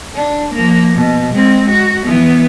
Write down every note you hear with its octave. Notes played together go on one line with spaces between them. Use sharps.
D4
F3 A#3
B2
G#3 C4
F#4
E3 B3